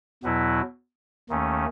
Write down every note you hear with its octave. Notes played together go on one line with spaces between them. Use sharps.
E2 B2 F#3 B3 E4
D#2 D#3 A3 C#4